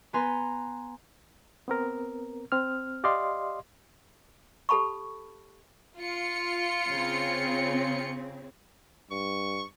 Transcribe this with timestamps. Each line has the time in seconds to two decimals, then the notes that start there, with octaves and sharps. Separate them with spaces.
0.13 B3 B4 G#5 A#5 C6
1.68 B3 C4 A#4
2.52 C4 F6
3.04 G4 D5 D#5 F5 C6
4.69 G4 A4 A5 B5 C#6
5.98 F4 C#7
6.90 C#3 C4
9.11 G2 C#6